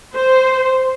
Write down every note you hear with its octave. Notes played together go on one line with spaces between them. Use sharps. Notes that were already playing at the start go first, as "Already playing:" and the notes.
C5